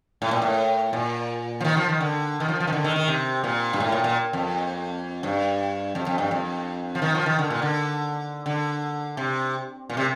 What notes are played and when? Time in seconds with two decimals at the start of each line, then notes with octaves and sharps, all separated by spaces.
0.22 A2
0.31 A#2
0.42 A2
0.93 A#2
1.60 F3
1.65 D#3
1.77 F3
1.89 D#3
2.00 D3
2.40 D#3
2.49 F3
2.60 F3
2.67 D#3
2.72 D3
2.84 D#3
2.96 D#3
3.08 C3
3.44 A#2
3.73 G2
3.80 A2
3.92 A#2
4.04 A#2
4.33 F2
5.23 G2
5.95 F2
6.07 F2
6.18 G2
6.31 F2
6.95 F3
7.02 D#3
7.15 F3
7.26 D#3
7.39 D3
7.50 A#2
7.62 D3
8.46 D3
9.17 C3
9.90 A#2
9.97 C3